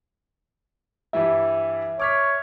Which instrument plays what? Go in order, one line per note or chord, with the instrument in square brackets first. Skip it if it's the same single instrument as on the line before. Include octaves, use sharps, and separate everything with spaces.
[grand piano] G2 E3 G3 [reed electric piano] E5
[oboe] C#5 [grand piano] D6 F6 B6